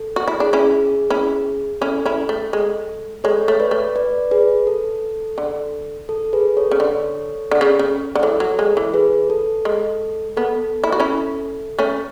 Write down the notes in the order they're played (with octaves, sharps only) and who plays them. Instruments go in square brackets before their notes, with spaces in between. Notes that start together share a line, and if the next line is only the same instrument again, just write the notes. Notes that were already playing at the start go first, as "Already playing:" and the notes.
Already playing: [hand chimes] A4
[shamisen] F#4
E4
[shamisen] D4 [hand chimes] G#4
[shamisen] C#4 E4 [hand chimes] G#4
[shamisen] C#4 E4
[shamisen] C#4 E4 [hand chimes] A4
[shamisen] C#4 E4
A3
G#3
[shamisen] G#3 [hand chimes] A4 C#5
[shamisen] A3 [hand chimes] C#5
[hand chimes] B4 D5
[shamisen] A3
[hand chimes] B4 D5
G#4 B4
A4
[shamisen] D3
[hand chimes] A4
G#4 B4
A4 C#5
[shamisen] C#3
D3
D3
C#3
C#3
D3
[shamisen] E3 [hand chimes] A4 C#5
[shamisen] F#3
G#3
E3
[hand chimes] G#4 B4
A4
[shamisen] G#3
[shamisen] B3 [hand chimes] A4
[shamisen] E4
F#4
C#4 E4
A3 C#4